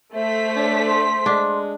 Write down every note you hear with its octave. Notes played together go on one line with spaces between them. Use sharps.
A3 C5 E5 B6
D4 C#5
C6
G#3 D4